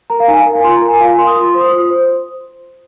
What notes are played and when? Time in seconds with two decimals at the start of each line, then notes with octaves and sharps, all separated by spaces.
0.10 A#4 A#5
0.20 F5
0.28 D#4 G#5
0.37 F5
0.46 A#4
0.55 G#5
0.64 F4 C6
0.76 A#5
0.82 A#4
0.88 G#5
1.00 F4 F5
1.09 G#5
1.18 A#4 C6
1.27 D#6
1.36 F4 C6
1.48 C6
1.55 C5
1.60 D#6
1.73 F4
1.90 C5